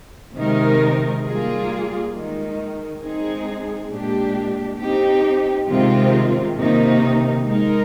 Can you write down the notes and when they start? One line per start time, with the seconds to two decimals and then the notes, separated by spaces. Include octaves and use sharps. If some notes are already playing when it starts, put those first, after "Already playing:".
0.36 C3 D#3 G#3 D#4 A#4
1.25 G3 A#3 F4 G#4
2.14 D#3 G#3 D#4
3.02 G#3 C4 D#4 G#4
3.91 A#2 G#3 D4 G4
4.80 C4 D#4 G4
5.68 C3 D#3 G#3 C4 F4
6.57 C3 D#3 A#3 D#4
7.46 G#3 D#4 A#4